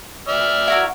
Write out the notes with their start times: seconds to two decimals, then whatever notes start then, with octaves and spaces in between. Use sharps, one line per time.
0.28 D5 E5 F6
0.68 E4 F#4 A#4